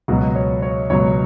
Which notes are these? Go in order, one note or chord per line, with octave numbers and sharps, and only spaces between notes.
C#2 B2 F#3 F#4
C#5
C#5
C#2 B2 F#3 C#5